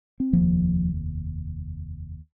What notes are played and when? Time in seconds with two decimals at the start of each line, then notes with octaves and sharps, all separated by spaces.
0.20 C4
0.33 F1 D#2 F3 A#3